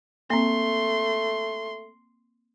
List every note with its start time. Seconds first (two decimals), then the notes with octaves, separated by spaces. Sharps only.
0.30 A3 A#3 C4 C6